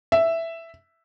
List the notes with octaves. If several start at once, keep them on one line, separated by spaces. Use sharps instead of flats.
E5